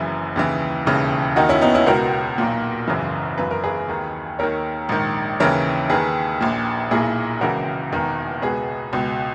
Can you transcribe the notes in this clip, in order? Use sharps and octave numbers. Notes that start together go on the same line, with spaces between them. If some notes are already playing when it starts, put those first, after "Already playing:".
Already playing: F#1 F#2 C#3 E3 E4 G#4
D#2 C#3 E3
E1 D#2 C#3 E3
D#2 D#3 D#4 F#4
C#4 E4
B3 D#4
C#4 E4
C#2 B2 F#4 A#4
B1 A#2
G#1 F#2 C#3 E3
G#1 F#2 E3 B4
A#4
G#4 B4
D#2 D#3
D#2 D#3 A#4 C#5
A#1 G#2 D#3
D#2 C#3 E3 A#4 C#5
D#2 D#3 G#4 B4
A#1 A#2
B1 A#2 E4 G#4
C#2 C#3 E3 F#4 A#4
E1 E2 D#3
C#2 B2 G#4 B4
C#2 B2